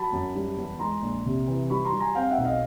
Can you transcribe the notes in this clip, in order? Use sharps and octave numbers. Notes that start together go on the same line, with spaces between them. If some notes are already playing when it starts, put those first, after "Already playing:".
Already playing: F#3 A5 B5
F#2
G3
E2
G#3 A#5 C6
A#1
C3
E3
G3 B5 C#6
A#5 C6
G3
G#5 A#5
C4 F5 G5
E5 F#5
B1
D#5 F5